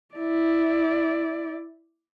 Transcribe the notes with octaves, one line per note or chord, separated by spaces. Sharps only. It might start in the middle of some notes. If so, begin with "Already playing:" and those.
E4 D5